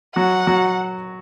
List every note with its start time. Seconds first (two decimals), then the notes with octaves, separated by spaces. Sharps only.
0.16 F#3 F#4 F#5
0.47 F#3 F#4